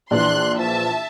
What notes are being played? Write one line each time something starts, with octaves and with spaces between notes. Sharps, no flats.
A#1 E3 D4 C6 F#6
F3 E5 A5